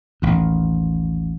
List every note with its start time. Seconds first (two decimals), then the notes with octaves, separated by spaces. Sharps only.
0.22 A1 D#2